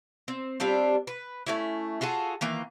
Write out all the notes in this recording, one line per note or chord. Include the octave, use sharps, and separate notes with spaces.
C4
G3 C4 D4 F4
B4
A3 C#4 E4
F4 F#4 G#4 A4
D#3 E3 A#3 F4